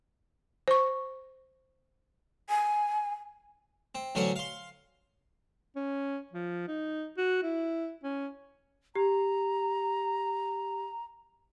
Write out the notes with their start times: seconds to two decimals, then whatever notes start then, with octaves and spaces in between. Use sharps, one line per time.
0.68 C5 C#6
2.49 G#5
3.95 C4
4.15 A1 D3 F#3 C#4 C5 F#5
4.36 F5 C6
5.76 C#4
6.33 F3
6.68 D#4
7.18 F#4
7.43 E4
8.04 C#4
8.95 G4 A#5